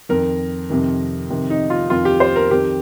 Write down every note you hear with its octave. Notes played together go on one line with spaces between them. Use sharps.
F2 D#3 A#4
F2 C3 D#3
F2 C3 D#3
D#4
F4
F2 D#3 F4
G4
C5
A#4
F2 D#3 G4